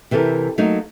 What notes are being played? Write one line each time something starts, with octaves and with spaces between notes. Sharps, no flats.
C3 E3 G4 A4 A#4
F#3 A3 A#3 D#4